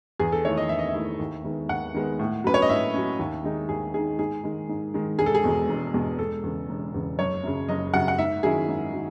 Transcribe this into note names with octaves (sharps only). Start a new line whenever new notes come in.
E2 G#4
A4
D#3 A3 E4 C#5
D#5
E2 E5
D#5
E5
D#3 A3 E4
D#2
D#3 G#3 B3
D#2 F#5
D#3 G#3 B3
A2
F#3 C#4 B4
C#5
D#5
A2 E5
F#3 C#4
D#2
D#3 G#3 D#4
D#2 G#4
D#3 G#3 D#4 G#4
G#2 G#4
D#3 G#3
G#2
D#3 G#3
E1 G#4
A4
G#4
E2 B2 G#3
E1
E2 B2 G#3
E1 A4
E2 C#3
E1
E2 C#3
F#1 C#5
F#2 C#3
F#1 D#5
F#2 C#3 F#5
F#5
G#2 E5
D#3 F#3 C#4 E4 G#4
G#2
D#3 F#3